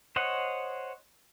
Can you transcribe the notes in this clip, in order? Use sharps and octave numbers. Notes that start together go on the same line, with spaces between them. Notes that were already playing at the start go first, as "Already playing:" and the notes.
C5 C#5 D#5 F#5